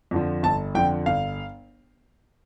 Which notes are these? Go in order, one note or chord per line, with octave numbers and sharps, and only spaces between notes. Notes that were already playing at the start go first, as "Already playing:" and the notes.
F2 D3 F3
G1 A5
F2 D3 F3 G5
G1 F5